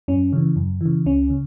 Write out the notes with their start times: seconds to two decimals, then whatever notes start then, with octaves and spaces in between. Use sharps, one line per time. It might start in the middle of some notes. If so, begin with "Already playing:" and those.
0.08 F#2 C#4
0.33 C#3 E3
0.56 F#2
0.81 C#3 E3
1.06 C#2 C#4
1.30 C#3